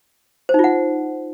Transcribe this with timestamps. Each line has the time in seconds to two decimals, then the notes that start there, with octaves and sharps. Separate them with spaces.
0.49 C5
0.54 D#4
0.59 F4
0.64 F#5